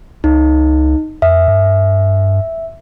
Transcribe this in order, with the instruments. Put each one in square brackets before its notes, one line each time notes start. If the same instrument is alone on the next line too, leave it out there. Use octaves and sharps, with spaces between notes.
[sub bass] C#2 [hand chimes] D#4
[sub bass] F2 [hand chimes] E5
[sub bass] G2